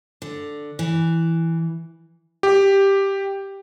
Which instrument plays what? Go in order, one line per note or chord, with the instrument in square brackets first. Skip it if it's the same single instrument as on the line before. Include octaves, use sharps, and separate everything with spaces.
[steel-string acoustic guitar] D3
E3
[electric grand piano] G4